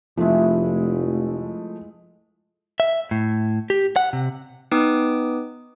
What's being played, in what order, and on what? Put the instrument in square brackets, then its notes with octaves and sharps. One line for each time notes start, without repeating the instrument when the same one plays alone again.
[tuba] F1 [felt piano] F3 A3 [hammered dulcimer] G#3 E4
[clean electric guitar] E5
A2
G4
F#5
C3
[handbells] B3 D#4 B4 G5 D6 D#6